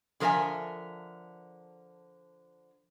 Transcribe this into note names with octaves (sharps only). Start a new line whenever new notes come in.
D3 F3 A#4 C5 E5 G#5